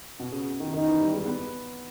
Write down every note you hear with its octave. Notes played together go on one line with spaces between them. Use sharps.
B2
C#3
D#3
D#3 D#4
E3
G3
G#3
B3